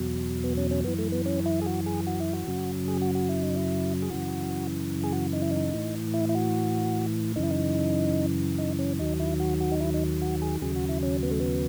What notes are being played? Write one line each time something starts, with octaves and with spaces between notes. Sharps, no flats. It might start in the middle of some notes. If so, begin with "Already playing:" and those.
Already playing: E2 B2 F#3
B3
C#4
C#4
F#2 E3 B3
A3
B3
C#4
E4
G#4
F#4
G#4
F#4
E4
F#4
F#2 C#3 F#3
G#4
F#4
F#4
E4
D#4
E4
G#4
F#2 C#3 E3 F#4
G#4
F#4
D#4
E4
D#4
A2 E3
E4
E4
F#4
F#2 C#3 E3 D#4
E4
D#4
D#4
C#4
D#2 D#3 F#3 D#4
E4
F#4
F#4
D#4
E4
D#4
F#4
G#4
D#2 C#3 F#3 G#4
F#4
E4
C#4
B3
A3
B3